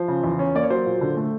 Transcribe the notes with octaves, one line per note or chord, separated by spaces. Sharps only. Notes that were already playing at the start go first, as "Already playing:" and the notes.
Already playing: F3 C5
C#3
E2
C#4
A#3 D5
C#5
F#3 C5
A#2
D3
A3